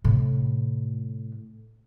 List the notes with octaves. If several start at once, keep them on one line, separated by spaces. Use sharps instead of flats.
A2 C3